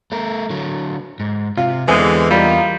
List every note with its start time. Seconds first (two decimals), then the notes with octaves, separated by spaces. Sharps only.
0.12 A3 A#4
0.50 D3 F#3
1.20 G#2
1.57 C3 F4
1.88 E2 D3 E3 G#3 C4 G#4
2.31 G3 A#3 D#4 F4